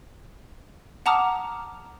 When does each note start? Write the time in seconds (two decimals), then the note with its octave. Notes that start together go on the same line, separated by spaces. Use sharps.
1.06 F#5 A5 A#5 D6 D#6 F6